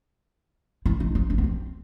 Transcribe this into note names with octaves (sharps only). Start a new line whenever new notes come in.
E4
D#4
D#4
D4
B3
C4